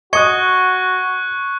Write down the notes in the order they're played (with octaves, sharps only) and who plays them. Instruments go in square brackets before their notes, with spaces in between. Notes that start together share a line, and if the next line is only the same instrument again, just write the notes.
[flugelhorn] F#4 [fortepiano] D#5 D#6 [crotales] C#6 F#6 [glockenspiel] G#6 C#7 G7